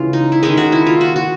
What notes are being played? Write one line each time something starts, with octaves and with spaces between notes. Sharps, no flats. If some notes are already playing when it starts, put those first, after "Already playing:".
Already playing: C#3 E3 G#3 F4
D#4
E4
D#3 G#3 C#4 D#4
F#4
E4
F4
F#4
F#4